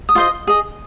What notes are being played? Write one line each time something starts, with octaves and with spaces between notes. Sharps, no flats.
D#6
F4 C5 D#5 C6
G#4 D#5